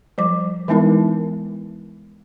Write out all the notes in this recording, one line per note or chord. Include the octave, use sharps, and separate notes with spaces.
F3 G3 D6
E3 G#3 B3 D#4 E4 A#4